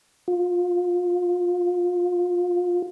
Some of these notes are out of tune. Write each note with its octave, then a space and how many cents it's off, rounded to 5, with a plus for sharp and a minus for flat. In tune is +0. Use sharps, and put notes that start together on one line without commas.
F4 +25